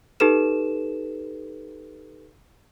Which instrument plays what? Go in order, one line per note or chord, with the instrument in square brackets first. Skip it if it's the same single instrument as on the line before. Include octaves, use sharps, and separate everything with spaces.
[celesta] D#4 G4 A4 B4 E7